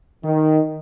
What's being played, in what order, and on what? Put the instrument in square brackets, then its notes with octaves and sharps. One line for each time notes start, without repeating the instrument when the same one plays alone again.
[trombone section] D#3